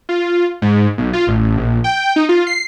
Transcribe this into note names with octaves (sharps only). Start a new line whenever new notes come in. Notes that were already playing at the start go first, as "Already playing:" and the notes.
F4
G#2
B1
F4
A1
A#1
G5
D#4
F4
C7